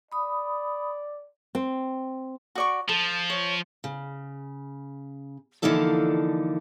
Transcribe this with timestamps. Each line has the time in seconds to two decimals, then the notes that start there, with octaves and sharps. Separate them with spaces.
0.12 D5 B5 D#6
1.55 C4
2.55 F#4 D5 C#6
2.89 F3 A4
3.30 C#5
3.84 C#3
5.62 D3 E3 F3 A#3 D#4 A4